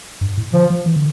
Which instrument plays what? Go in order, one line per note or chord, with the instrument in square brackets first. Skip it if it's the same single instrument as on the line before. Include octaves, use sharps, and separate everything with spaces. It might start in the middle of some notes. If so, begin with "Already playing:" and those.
[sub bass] G2
A2
[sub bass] D3 [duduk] F3
[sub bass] F3
E3
D3